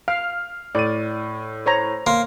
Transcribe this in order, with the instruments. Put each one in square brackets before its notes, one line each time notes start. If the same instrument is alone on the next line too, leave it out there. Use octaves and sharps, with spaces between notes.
[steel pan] F5 [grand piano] F6
[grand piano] A2 D#7 [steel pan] D5
[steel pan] C5 C#5 A#5
[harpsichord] A#3 [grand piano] C6